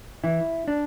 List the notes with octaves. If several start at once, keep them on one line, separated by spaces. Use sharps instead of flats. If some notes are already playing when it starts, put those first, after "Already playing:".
E3 E4
D4